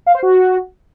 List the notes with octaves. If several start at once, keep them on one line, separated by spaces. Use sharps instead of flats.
F5
C5
F#4